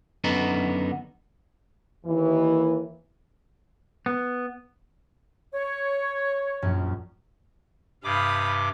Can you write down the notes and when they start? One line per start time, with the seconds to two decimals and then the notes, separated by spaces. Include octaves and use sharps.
0.24 F#2 D3 B3 D#4 F#4
2.06 D#2 E3
4.06 B3
5.53 C#5
6.62 A#1 F#2 C#4
8.04 G2 C3 F5 B5 D6 D#6